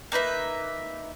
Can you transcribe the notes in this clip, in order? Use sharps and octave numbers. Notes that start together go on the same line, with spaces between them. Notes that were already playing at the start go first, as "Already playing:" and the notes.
A#3 D#4 B4 E5